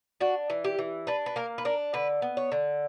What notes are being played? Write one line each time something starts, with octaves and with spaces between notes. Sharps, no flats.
D4 F#4
E3
G4
E3
D4 B4
B4
A#3 A#4
B4
D4 A#4
D3 B4
B3
C#5
D3